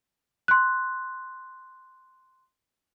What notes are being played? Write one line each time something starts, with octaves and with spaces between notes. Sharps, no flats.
C6 F#6